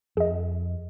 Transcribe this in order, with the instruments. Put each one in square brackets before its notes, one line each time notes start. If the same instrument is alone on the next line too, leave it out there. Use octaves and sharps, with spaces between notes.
[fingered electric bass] F2 [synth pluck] G#4 D#5